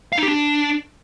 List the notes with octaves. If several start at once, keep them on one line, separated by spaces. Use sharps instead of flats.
F5
D#4
G4
D4